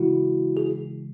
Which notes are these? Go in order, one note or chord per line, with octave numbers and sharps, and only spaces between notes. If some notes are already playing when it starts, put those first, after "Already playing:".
Already playing: C#3 E3 G#3 E4 F#4
G#4